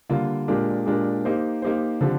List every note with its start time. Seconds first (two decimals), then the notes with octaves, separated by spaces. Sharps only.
0.09 D3 G3 A#3 F4
0.48 A#2 G#3 D4 G4 A#4
0.86 A#2 G#3 D4 G4 A#4
1.25 A#3 D#4 G4 C5
1.62 A#3 D#4 G4 C5
2.01 D3 F3 C4 G4